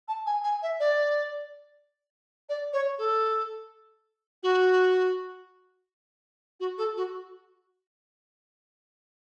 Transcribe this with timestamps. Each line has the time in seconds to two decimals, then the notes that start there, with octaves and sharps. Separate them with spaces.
0.08 A5
0.26 G#5
0.43 G#5
0.62 E5
0.79 D5
2.49 D5
2.73 C#5
2.98 A4
4.43 F#4
6.60 F#4
6.78 A4
6.96 F#4